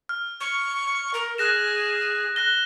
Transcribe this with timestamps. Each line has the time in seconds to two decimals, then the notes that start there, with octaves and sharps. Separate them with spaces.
0.09 F6
0.41 C#6
1.14 A#4
1.38 G#4 F#6 A#6 E7
2.36 F#6 A#6 G7